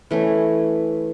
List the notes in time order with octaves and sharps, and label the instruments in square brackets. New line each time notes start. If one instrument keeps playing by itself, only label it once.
[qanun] E3 A3 C#4